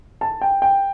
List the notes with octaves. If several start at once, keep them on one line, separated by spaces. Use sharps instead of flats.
A5
G5
G5